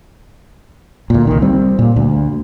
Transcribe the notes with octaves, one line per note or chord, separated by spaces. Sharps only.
D2 A#2
C2 D#3
G3 C4
A#2
D2